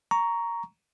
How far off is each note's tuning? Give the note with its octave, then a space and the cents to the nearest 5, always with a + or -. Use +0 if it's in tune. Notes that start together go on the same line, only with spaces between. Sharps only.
A#5 +0 C#6 +15